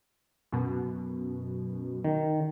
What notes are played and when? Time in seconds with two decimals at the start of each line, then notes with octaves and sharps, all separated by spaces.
0.52 F#2 B2
2.04 D#3